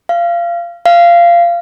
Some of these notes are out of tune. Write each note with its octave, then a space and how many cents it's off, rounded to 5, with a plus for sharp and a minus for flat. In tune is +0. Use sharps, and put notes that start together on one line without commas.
F5 -25
F5 -20